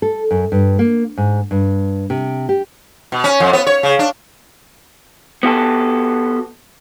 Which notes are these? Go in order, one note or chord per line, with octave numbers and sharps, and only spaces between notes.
A4
F#2
G2
A#3
G#2
G2
C3
G4
B2
C#4
F2
B3
C#5
C#3
D4
B3 F#4 G4 A4